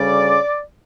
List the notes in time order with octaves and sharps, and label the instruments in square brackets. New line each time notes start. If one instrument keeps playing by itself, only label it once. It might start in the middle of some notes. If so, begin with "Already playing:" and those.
Already playing: [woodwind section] D2 C#3 G3 D5